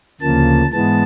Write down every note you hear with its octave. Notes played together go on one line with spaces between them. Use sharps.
D2 C#3 F3 A#3 A5
G#2 E3 G#3 B3 A5